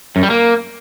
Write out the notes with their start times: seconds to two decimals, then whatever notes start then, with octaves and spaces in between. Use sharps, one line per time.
0.16 F#2
0.23 G3
0.30 A#3